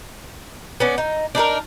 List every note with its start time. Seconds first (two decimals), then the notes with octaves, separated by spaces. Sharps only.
0.80 B3 C#4 D4
0.98 D#4
1.35 D4 D#4 G#4 A#4